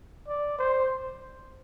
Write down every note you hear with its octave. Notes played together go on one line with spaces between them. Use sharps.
D5
C5